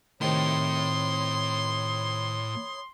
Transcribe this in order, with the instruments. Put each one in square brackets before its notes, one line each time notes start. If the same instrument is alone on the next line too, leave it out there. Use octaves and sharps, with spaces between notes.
[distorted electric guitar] A2 [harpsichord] C3 D#3 [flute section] C#5 B5 D#6 [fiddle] C6